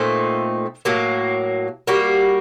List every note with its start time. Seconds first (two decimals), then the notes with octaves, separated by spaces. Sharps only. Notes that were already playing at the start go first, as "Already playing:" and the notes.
Already playing: A#2 A3 C4 D#4
0.85 A2 F#3 A#3
1.87 G3 A#3 F#4